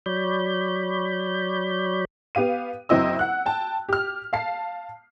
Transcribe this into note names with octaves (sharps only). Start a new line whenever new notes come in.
F#3 C#5 D5 B5 G6
B3 G4 F5 D#7
F#1 F#3 C4 E4 D#5 E6
F#5 F#6
G5 A5
G4 F6
F5 A5 C7